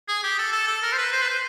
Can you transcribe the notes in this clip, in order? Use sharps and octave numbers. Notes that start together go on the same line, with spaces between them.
G#4
G4
A4
A4
A4
A#4
C5
B4
C5
B4
C5